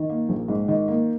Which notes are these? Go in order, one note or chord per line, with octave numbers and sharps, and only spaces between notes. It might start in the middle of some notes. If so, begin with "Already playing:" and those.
Already playing: D#3
A#3
A#1
G#2
D#3
A#3